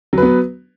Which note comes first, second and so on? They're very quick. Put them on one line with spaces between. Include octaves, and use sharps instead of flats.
F#3 B4 B3